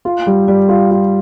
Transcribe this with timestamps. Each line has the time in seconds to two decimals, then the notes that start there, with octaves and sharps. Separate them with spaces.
0.05 F4
0.27 G3
0.48 G3
0.69 F4
0.91 F4